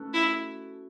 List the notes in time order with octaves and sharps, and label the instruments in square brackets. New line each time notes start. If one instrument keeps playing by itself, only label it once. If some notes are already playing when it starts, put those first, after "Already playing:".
Already playing: [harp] A3 C#4 F#4 A4 B4
[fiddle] E4